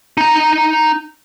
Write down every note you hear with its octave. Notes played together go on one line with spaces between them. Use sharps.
D#4 A#5